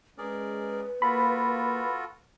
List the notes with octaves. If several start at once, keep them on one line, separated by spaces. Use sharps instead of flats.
G#3 C#4 G#4 A#4 B4 D5
A#3 F4 F#4 A4 B5